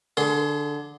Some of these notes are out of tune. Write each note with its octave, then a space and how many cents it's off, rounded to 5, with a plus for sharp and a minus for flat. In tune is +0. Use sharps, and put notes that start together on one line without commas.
D3 +0 G#4 +30 C6 -15